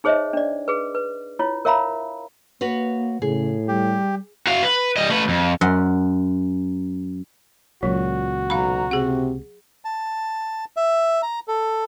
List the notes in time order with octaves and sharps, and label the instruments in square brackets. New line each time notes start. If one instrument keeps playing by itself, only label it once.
[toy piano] D#4 G#4 C5 C#5 D#5 E5
D4 D5
G#4 B4
B4
E4 F4 C#5
A#4 C#5 E5 F5 A#5 B5
[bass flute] A#3 [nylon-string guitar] F#4 B4 C#5
[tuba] A2 [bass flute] C#3 [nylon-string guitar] G#4
[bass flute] G3 [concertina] G4
[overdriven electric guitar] F#4 F5
B4
G3 D#5
A3 B4
F2
[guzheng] F#2 F#5 C6
[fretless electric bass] C#2 A#2 [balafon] F#3 [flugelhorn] F#4
[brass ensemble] B1 A#5 [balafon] F5 B5
[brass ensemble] C3 [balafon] G#4 F#5
[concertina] A5
E5
A#5
A4